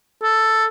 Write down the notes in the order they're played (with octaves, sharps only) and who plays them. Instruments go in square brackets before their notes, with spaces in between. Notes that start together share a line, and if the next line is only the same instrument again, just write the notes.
[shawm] A4